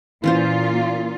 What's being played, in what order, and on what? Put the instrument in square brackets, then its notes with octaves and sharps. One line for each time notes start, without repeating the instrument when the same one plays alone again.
[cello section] A#2 F4 [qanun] E3 C#4 C5